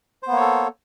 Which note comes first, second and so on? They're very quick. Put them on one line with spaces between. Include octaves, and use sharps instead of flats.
C5 B3 A#3 C#5 A4